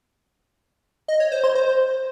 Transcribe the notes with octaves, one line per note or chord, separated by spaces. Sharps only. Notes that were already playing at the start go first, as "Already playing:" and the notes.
D#5
C#5
C5
C6
C5